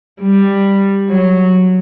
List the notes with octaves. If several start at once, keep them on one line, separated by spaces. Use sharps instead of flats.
G3
F#3